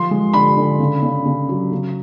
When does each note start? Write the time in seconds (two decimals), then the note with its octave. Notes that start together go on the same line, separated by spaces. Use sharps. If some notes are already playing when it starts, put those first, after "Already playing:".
Already playing: F3 C6
0.11 G#3
0.33 D3 B5
0.57 D3
0.80 C#3
1.02 C#3
1.25 C#3
1.49 F#3
1.72 C#3